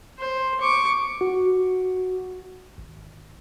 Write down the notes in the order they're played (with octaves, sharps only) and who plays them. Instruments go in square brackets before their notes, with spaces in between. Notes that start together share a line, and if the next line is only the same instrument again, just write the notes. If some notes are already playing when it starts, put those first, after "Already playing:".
[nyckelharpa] C5
C#6 D6
[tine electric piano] F#4
G#1